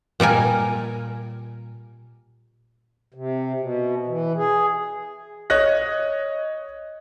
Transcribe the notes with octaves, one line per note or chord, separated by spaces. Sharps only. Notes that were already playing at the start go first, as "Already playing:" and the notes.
A#2 G3 A#4 G#5
C3
B2
E3
G#4
C#5 D#5 F#6 A#6